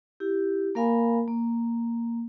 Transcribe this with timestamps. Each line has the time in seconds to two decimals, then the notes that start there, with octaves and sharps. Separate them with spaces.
0.20 E4 G4
0.75 A#3 A#4 F5 G#5 B5
1.28 A#3